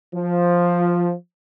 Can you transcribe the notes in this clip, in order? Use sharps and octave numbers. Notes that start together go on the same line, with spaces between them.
F3